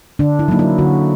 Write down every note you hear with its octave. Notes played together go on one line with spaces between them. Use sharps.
D3 D4
E4
F#3 A#3 D#4
E4
D3 F#4